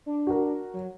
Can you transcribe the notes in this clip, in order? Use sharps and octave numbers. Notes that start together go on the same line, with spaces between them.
D4
F#4 A#4
F#3